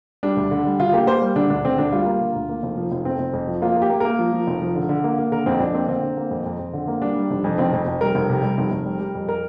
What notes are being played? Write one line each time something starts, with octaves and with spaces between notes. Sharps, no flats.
G3 D4
D2
D3
G3
D3 F4
A#3 G4
A#3 C5
G3
D3 D4
D2 D4
D3 C4
D2 D4
G3 F4
A#3
D3
D2
A#3
F1
F3
F1
F2 C4
F1
F2
F3
A#3 F4
A#3
G4
A#3
A#3 A#4
F3
F3
F1
F3
D3
D3
A#3
A#3
D3 A#4
F2 C4
F2 D4
A#3 C4
D3 C4
D3
A#3
F2
F2
F2
D3
A#3
G3 D4
G3
F1
F2
F1 C4
F2
F1
G3 A#4
F1
C3
G3
F1
F1
G3
G3
F2
A#4